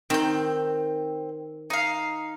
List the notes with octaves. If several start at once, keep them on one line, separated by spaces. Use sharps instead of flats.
D#3 C4 G6
D#4 F5